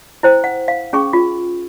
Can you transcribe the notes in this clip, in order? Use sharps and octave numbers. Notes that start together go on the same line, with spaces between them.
E4 C5 G5
F#5
F5
C#4 G#4 G5 C#6
F4